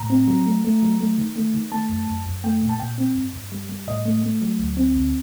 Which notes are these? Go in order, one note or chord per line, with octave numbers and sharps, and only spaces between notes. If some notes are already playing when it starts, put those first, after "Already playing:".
Already playing: A2 A#5
C4
F#3
A3
A3
F#3
A3
D#3
A3
D#3
A3 A5
F#2
F#2
F#2
A3 G5
A#2
A5
A#2 G5
C4
G2
G2
G3
G3
A2 D#5
A3
A3
F#3
D2
C4
D2